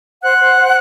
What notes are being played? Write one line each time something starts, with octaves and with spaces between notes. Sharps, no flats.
C5 F#5 F#6
C5
C5